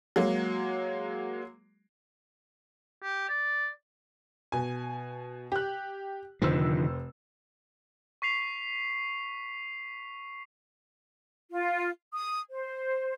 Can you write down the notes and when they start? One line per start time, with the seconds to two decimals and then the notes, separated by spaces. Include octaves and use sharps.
0.16 F#3 G#3 A#3
3.03 G4
3.29 D5
4.52 B2 G#5
5.52 G4 F#6
6.42 F1 D3 D#3 F3 C5 E6
8.22 C#6 B6 C7 F7
11.52 F4
12.13 D#6
12.51 C5